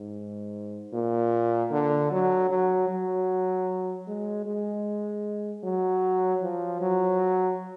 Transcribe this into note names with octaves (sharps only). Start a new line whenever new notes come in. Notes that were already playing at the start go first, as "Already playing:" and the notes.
Already playing: G#2
A#2
D3
F#3
F#3
F#3
G#3
G#3
F#3
F3
F#3